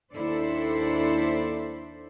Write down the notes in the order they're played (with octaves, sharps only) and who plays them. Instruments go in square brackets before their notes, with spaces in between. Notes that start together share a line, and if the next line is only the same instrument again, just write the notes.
[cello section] D#2 D4 E4 A4 C5 D5